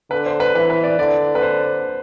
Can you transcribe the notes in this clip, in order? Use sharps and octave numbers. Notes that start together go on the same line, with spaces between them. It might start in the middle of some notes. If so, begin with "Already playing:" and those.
D3 B4
C5
B4
E3 B4
B4
D5
D3 D5
B4
C5